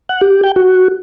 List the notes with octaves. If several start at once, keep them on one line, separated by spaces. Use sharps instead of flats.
F#5
G4
G5
F#4